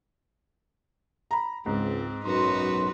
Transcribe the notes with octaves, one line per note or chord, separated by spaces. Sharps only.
A#5 B5
C#2 G#2 C4
B1 F#2 D#4 F#4 B4 C6